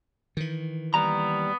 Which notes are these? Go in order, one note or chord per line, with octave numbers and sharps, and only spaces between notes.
D#3 E3
D#2 G3 B3 A#5